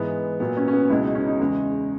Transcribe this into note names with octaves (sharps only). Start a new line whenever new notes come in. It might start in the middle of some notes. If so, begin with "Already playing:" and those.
Already playing: G#2 E3 G#3 B3
A#2 F#3 B3
C#4
C#4
B3
C#2 B2 G#3 E4
D#4
C#4
D#4
E2 C#3 G#3